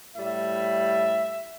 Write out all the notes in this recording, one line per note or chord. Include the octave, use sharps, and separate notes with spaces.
A2 G3 E5